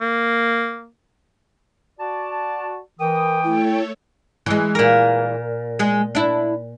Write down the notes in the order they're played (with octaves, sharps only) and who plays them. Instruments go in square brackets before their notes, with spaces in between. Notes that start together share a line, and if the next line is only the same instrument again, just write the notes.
[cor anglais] A#3
[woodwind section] F#4 D5 A5
[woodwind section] E3 D#6 [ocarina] A#4 [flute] G5
[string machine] A3 A4 C#5 [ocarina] E4
[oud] E3 G#3
[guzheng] A#2 A#4
[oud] G#3 G#4
D4 E4